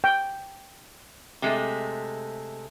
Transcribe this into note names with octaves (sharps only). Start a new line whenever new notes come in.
G5
C3 G#3 A3